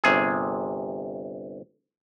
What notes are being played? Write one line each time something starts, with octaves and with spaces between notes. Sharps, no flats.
G1 C3 G#4